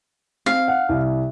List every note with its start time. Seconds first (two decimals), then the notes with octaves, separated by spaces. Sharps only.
0.46 C4 F5
0.68 F#5
0.89 C2